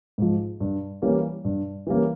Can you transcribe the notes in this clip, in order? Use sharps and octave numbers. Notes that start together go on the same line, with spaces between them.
G#2 F3
G2
E3 G3 A#3 C#4
G2
E3 G3 A#3 C#4